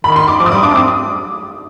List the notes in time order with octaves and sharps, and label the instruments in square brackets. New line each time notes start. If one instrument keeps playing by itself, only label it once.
[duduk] D#3 [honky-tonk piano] B5
[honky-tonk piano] C6
D6
[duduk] F3 [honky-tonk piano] D6
[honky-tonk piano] D#6
[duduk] G3 [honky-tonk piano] D6
[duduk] D4 [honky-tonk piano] D6
[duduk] C4 [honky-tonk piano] D#6